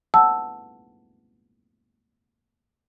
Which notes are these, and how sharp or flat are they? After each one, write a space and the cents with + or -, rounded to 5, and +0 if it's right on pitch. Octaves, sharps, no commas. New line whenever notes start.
F#5 +0 A5 +0 E6 +0